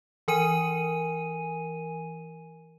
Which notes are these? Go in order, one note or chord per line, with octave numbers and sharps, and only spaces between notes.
E3 A#4 G#5 D#7